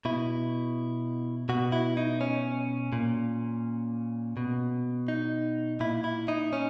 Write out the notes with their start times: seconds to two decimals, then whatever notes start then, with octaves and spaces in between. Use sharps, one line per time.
0.05 B2 E4
1.49 B2 F#4
1.72 E4
1.97 D#4
2.21 C#4
2.93 A#2
4.37 B2
5.08 D#4
5.80 A#2 E4
6.04 E4
6.28 D#4
6.53 C#4